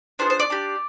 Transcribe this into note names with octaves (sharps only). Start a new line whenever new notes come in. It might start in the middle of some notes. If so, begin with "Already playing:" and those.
B3 D4 F4 G#4 C5
C5
D5
D4 G4